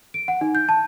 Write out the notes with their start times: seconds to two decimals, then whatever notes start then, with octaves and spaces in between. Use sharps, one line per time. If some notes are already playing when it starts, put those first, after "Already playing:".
0.14 D7
0.28 F#5
0.41 D#4
0.55 G6
0.69 A5